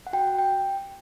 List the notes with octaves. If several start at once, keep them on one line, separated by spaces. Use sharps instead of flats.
F#5
F#4 G5
G5